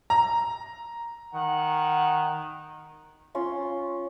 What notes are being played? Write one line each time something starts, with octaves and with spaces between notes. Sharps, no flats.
A#5
D#3 F#5
C#4 F4 C6 C#6